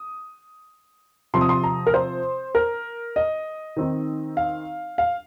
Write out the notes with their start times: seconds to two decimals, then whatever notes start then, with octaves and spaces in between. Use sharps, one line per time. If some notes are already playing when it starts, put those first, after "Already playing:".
Already playing: D#6
1.34 C3 F3 C4 C6
1.41 D#6
1.49 C6
1.64 A#5
1.87 A#4
1.94 C5
2.55 A#4
3.16 D#5
3.76 D#3 C4 D#4
4.37 F5
4.98 F5